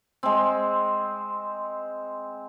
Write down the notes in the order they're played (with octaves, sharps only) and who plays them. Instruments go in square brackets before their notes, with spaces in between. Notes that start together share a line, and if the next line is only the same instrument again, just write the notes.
[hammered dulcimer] G#3 C4